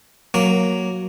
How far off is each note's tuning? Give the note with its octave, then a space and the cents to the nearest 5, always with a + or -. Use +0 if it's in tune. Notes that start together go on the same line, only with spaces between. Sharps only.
F#3 +0 A#3 +0 C#6 +0